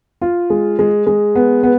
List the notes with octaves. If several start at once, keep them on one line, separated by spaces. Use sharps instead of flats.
F4
G#3
G#3
G#3
B3
B3